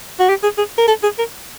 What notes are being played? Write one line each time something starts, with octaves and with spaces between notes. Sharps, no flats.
F#4
G4
G#4
G#4
A#4
A4
G#4
A#4